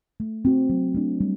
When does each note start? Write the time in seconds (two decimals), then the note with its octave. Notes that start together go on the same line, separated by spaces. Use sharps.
0.20 A3
0.45 C4 F#4
0.70 F#3
0.95 A3 D4
1.20 G3